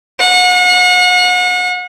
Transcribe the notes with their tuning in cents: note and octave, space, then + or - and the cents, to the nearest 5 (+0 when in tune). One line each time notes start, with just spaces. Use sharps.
F#5 -40